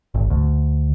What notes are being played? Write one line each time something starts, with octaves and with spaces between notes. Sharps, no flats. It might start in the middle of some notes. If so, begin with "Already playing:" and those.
G#1
D2